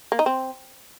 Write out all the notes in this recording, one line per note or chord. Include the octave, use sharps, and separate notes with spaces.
A#3
D#4
C4